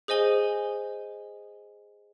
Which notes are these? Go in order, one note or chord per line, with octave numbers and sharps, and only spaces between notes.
G#4 C5 D#5 G#5 G7